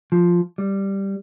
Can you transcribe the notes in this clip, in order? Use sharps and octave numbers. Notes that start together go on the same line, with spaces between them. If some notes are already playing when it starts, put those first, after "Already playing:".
F3
G3